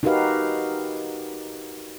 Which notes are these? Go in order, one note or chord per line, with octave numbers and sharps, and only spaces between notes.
D#4 F#4 G4 A#4 B4 F5